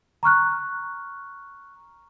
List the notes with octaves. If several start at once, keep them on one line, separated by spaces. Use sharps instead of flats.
A#5 C#6 F6 F#6